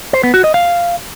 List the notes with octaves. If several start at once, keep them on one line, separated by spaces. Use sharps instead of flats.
C5
B3
F#4
D#5
F5